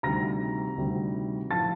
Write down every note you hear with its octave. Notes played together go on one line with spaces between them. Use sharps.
D2 C3 D#3 G3 A#5 A#6
D2 C3 D#3 G3
A2 F3 A5 A6